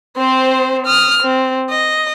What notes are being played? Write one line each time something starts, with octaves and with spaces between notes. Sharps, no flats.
C4 C5
D#6 F6
C4
D#5